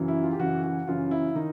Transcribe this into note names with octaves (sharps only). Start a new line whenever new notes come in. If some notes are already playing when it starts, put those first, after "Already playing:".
Already playing: F#2 C#3 E3
E4
F4
G4
F#2 C#3 E3 F#4
F#4
F#2 C#3 E3 F4
E4
D#3 D#4